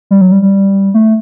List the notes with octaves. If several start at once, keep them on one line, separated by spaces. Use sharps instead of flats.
G3
F#3
G3
G3
A3